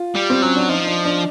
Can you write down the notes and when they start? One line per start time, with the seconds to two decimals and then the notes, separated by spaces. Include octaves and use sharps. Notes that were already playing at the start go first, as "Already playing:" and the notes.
Already playing: F4
0.15 G3
0.30 C4
0.42 F#3 C#4
0.56 D4
0.69 F3 D#4
0.86 D4
1.05 D4